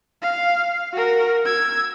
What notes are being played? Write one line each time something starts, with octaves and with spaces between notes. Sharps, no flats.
F5
F#4 A#4
E6 G#6